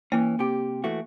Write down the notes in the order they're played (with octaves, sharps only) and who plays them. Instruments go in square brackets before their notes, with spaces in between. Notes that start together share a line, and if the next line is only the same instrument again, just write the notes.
[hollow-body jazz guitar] E3 C#4 [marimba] A#3
[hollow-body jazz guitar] C3 G4
E3 A3 F#4